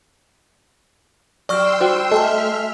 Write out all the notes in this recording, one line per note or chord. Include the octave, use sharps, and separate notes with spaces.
F#3 G4 D5 G5 C6 C#6 E6 F6
G3 F#4 C5
A3 D#5 E5 G#5 A5 F6